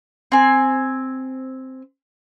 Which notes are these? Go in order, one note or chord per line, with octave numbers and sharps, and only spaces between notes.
C4 G#5